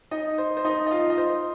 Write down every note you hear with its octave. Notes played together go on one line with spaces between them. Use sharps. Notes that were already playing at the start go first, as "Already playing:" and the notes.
D#4 D#5
C5
C5
D#4 D#5
D#5
F4 F5
D#5
C5